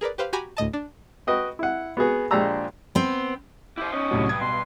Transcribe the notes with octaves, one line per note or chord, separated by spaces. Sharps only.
G#4 A#4 B4 D5
G4 B4 C5 F5
F#4 G4 G#5 A#5 B5 D6
D2 A2 D#5 A5
D4
F#4 B4 D#5 G5
E4 F#5
B3 F#4 G#4 B4
A#1 G#3 D4 G4 A#5 E6
B3 C4
E4 G4 C5
C#4 D#4 D#6
C2 A2 F#3
G2 G#6
B2 C6